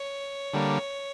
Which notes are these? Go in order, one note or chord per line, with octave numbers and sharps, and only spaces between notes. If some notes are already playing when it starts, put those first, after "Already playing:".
Already playing: C#5
D3 G3 A#3